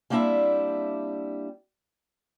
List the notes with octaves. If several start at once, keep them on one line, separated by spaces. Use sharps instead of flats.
G3 A#3 C4 D4 E4 E5